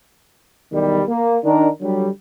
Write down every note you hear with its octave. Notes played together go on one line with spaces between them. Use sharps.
B1 E2 D#3 G3
A#3
D#3 D4 A#4
D3 F#3 G3